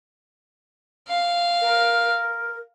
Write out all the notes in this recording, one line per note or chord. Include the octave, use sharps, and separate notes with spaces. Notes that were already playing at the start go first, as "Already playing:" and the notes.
F5
A#4